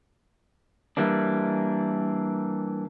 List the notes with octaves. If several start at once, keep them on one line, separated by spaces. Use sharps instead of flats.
E3 G3 A#3 D4